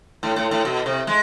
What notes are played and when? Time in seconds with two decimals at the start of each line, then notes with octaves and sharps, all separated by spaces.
0.23 A2
0.36 A2
0.51 A2
0.65 B2
0.86 C3
1.07 G#3